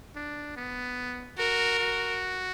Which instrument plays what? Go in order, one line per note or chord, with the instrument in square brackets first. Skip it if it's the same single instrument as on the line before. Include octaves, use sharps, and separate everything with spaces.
[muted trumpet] D4
B3
[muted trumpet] F#4 [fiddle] A#4
[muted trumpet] F#4